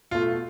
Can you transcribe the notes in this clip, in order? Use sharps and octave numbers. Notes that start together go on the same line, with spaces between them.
B2 A3 F4